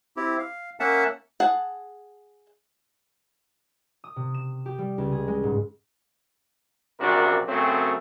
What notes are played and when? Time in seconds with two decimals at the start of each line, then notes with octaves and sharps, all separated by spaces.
0.17 C4 E4 G4
0.39 F5
0.80 A#3 C#4 E5 F#5 A5
1.40 G#4 F#5 A5
4.04 D#6
4.16 C3
4.34 E7
4.66 G4
4.78 G3
4.98 C#2
5.12 G#4
5.27 G#3
5.43 G#2
7.00 A#1 F#2 C3 D4 F#4 A#4
7.48 F#2 C#3 F#3 A3 C4